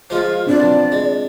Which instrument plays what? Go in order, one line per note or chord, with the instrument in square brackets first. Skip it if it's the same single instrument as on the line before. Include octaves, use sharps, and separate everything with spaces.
[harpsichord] F3 G#3 [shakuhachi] F4
[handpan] C4 D4 F4 [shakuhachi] D5
[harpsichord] B1
G#3